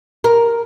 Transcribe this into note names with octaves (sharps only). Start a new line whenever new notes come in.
A#4